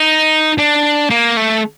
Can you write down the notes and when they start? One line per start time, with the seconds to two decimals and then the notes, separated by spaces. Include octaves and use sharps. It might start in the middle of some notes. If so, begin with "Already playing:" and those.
Already playing: D#4
0.58 D4
1.10 A#3
1.37 A3